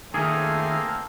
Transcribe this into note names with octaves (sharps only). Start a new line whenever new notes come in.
D#3 A3 A#3 C4 G#4 A4